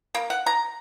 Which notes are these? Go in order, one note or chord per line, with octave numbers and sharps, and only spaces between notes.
A#3
F#5
A#5